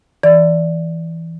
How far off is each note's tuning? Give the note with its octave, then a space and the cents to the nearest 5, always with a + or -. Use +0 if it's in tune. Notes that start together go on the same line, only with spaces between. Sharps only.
E3 +0 D5 +0